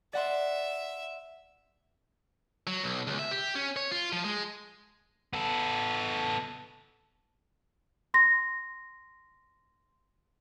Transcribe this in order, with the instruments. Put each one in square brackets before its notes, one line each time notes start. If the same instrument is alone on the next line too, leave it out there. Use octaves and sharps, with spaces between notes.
[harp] D5 F#5 C6 [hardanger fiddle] E5
[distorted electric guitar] F#3
B1
C#2
E5
G4
C#4
C#5
F4
F3
G#3
[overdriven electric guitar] B3 A4
[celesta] C6 A#6